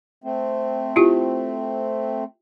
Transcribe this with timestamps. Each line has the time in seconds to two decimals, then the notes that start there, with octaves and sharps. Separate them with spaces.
0.24 A3 C4
0.96 E4 F4 G4